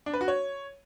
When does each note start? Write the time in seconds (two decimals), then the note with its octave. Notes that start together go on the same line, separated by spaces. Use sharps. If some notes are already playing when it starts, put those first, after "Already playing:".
0.06 D4
0.13 B4
0.21 F#4
0.28 C#5